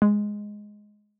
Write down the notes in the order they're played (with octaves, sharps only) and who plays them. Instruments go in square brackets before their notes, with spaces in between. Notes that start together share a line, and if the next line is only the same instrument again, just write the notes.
[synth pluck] G#3